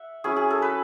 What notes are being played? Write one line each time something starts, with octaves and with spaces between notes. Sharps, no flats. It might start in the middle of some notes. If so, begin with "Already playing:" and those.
Already playing: E5 F#5
F#3 C#4 E4 G#4
G#4
A4
B4